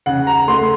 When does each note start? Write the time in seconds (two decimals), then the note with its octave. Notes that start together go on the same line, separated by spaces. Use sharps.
0.06 C#3 F#5
0.27 A#5
0.48 A3 C6